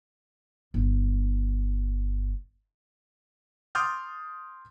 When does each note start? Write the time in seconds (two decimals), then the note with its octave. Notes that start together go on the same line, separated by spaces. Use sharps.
0.74 G1 D#4
3.75 C6 D6 D#6 F6 G6 A6